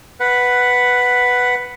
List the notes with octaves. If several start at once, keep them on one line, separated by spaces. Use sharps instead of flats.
B4 F#5